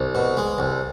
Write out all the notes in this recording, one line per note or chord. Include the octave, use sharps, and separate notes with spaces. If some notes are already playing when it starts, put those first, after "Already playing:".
Already playing: C2
B2
G#3
C2